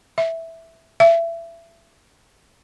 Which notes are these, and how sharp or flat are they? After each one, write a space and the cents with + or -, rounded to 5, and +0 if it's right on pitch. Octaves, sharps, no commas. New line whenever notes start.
E5 -5
E5 +25